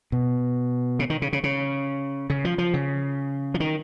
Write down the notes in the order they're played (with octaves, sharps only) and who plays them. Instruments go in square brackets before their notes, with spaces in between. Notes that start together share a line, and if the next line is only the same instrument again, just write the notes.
[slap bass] B2
C#3
D#3
C#3
C#3
C#3
C#3
F3
F3
C#3
F3
D#3